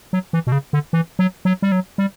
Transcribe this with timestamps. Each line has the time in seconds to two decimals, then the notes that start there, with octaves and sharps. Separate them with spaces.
0.13 F#3
0.33 E3
0.47 B2
0.52 C#3
0.73 D3
0.93 E3
1.19 F#3
1.45 F#3
1.62 G3
1.72 F#3
1.98 G3